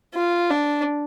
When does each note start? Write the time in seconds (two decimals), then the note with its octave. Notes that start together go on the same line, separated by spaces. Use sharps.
0.14 F4
0.50 D4